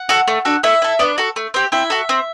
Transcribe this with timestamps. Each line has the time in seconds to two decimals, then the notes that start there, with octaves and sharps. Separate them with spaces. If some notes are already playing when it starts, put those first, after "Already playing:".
Already playing: F#5
0.09 F#4 A4
0.28 A3
0.45 D4 F#4 A4
0.63 A3 E4 E5
0.82 E4 A4
0.99 B3 D4 D5
1.18 F#4 A4
1.36 A3
1.54 C4 G4
1.72 C4 E4 E5
1.90 F#4 A4
2.09 C4